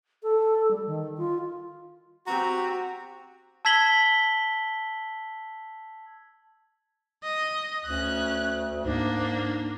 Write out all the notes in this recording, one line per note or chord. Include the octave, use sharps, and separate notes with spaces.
A4
G3
D#3
F4
C4 F#4 G4 A#5
A5 E6 G#6 B6 F#7 G7
D#5
D2 C#4 F#6
G#2 A#3 D4